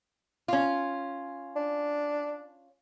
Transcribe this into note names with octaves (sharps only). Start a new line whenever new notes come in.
C#4 F4
D4